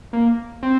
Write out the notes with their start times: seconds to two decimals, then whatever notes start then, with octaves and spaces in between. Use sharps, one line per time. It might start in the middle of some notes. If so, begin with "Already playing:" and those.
0.13 A#3
0.63 C4